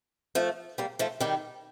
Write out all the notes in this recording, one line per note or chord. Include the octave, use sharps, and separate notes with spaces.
F3 A3
G3 A#3
F3 A3
D#3 G3